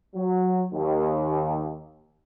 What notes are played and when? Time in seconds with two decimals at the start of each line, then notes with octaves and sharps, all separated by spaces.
0.15 F#3
0.73 D#2